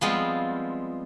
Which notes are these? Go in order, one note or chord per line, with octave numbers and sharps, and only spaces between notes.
F3 G3 G#3 B3 C4 F4